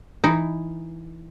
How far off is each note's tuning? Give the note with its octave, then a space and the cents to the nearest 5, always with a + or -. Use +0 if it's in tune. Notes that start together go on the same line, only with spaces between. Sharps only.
E3 +0 D#4 +0